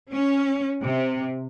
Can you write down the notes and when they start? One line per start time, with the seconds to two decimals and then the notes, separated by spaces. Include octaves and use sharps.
0.12 C#4
0.83 C3